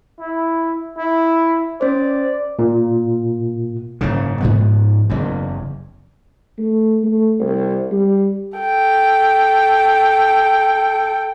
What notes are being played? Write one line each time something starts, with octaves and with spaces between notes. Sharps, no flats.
E4
E4
C#4 C5 D5
A#2
F#1 G#2 C#3
G#2 F3 B3
F#1 E2
A3
A3
C2
G3
A4 G5